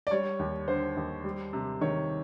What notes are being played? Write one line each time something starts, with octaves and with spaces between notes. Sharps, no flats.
D5
G3 C#5
D#2
D3 C5
D#2
G3
C3
D#3 C#5